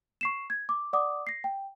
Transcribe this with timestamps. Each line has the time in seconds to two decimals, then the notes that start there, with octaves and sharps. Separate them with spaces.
0.21 C#6 C7 E7
0.50 G#6
0.69 D6
0.93 D5 F#5 D6 D#6
1.27 A#6 C7
1.44 G5